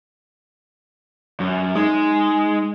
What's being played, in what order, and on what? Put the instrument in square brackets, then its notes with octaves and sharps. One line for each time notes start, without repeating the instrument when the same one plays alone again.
[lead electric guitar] F#2
[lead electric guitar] G#3 [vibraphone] D#4